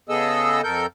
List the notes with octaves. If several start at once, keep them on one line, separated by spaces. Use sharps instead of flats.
C#3 B3 G#4 A4 D#5 E6
F2 A4 A#4 G6